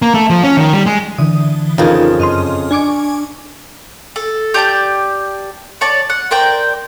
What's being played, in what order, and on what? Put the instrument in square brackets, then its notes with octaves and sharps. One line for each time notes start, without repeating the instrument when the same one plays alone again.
[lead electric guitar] A#3
A3
F3
C#4
D#3
G3
G#3
[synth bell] D3 E3 D#6
[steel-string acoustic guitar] F2 C#3 [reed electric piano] D#4 F4 A#4
[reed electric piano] F#2 C6 [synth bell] D#5 F6
[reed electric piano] D4 [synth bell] G#5 C#6 D6
[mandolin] A4
G4 D5 A5 G6
C#5 D5 A5
F#5
A#4 C5 D5 G5